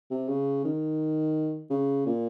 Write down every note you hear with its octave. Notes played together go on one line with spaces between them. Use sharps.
C3
C#3
D#3
C#3
A#2